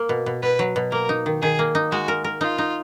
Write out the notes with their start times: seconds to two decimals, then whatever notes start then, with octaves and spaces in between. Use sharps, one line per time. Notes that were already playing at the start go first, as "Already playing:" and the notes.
Already playing: A#3
0.09 B2
0.26 B2
0.42 B2 B4
0.59 F#3
0.76 B2
0.92 A#3 A#4
1.09 D#4
1.26 D#3
1.42 D#3 G#4
1.59 A#3
1.75 D#4
1.91 G#3 F#4
2.08 A#4
2.24 A#4
2.41 D#4 F4
2.58 D#4